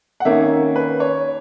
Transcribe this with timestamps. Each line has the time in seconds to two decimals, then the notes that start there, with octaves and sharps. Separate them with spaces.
0.20 F#5
0.25 D#3 A#3 C#4 E5
0.76 B4
1.00 C#5